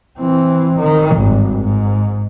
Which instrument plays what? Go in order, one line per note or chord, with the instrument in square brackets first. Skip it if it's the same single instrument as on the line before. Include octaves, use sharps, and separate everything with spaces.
[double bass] E3 C4
D#3
G#1 G2
G#2